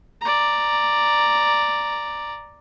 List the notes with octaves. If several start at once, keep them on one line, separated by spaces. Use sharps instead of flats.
D5 A#5